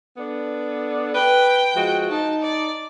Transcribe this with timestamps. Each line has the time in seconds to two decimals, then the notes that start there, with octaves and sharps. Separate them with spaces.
0.17 B3 D4 A4
1.15 B4 G5
1.76 F3 G#3 F#4
2.10 D#4 A5
2.42 D5